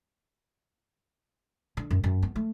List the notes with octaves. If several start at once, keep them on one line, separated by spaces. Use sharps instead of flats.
D3
F#2
F#2
B3
A3